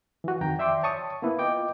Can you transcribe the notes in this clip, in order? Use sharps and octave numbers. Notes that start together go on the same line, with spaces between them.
E3 F#4
F2 D#3 G5 A#5
D5 E5 G5 C6 D6
C#5 A5 C#6 D#6
A#3 B3 E4 B4
F4 D#5 G5 D6